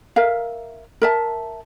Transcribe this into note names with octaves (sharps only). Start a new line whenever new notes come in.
A#4 E5 F5
A#4 E5 A5